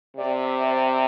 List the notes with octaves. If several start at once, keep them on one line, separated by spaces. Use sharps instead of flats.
C3 D5
E5
C5
D5